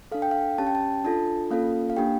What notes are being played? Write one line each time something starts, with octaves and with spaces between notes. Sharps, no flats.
D4 A4 F5
G5
F5
C#4 G4 A5
G5
A5
D4 F4 A4 A5
A#3 C#4 F4 A4 F5
F5
A#3 D4 G4 G5